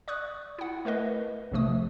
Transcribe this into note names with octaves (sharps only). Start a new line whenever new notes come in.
D5 C#6 D#6 F#6
E4 F#5
A3 A#4 B4 D#5
A#1 C3 F3 A3 D#6